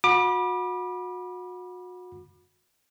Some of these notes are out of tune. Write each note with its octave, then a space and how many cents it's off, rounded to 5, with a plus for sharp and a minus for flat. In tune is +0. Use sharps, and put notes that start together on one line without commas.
F#4 -35 B5 -25 D6 +30